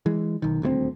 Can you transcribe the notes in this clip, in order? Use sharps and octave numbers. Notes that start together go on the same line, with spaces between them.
E3 G#3
B1 D#3
D#1 D2 G#3 C4